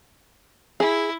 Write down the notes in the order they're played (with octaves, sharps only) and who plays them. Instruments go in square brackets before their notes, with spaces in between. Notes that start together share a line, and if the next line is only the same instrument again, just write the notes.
[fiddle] E4 [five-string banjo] G#4